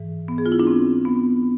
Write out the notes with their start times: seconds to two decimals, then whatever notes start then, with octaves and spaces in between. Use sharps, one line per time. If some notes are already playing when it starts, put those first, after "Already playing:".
Already playing: G#2 E3
0.28 B3
0.38 G#4
0.46 F4
0.52 E4
0.60 D4
0.67 C4
1.05 B3